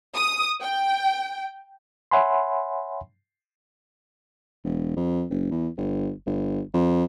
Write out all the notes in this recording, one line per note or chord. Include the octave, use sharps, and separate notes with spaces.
D#6
G5
C#5 E5 F#5 G#5 B5 C6
E1
F2
F#1
E2
G1
G1
F2